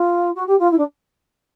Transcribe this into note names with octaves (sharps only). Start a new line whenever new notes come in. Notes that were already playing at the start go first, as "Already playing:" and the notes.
Already playing: F4
F#4
G4
F4
E4
D4